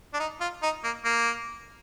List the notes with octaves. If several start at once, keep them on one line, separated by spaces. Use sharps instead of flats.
D4
D#4
F4
D#4
A#3
A#3